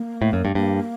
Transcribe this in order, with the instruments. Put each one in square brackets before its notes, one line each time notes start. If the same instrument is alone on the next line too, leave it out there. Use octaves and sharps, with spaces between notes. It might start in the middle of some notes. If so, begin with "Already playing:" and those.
Already playing: [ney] A#3
[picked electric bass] A2
F#2
G2
[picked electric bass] G2 [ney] A#3